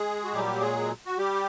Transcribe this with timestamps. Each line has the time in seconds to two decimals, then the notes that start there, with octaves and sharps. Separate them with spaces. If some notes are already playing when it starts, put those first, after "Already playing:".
Already playing: G#3 G#4
0.24 F#4
0.32 A#2 F#3 G3 G4
0.61 G#3 G#4
1.06 F#4
1.18 G3 G4